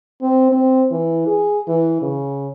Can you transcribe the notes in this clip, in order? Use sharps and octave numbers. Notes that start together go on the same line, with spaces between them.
C4
C4
E3
G#4
E3
C#3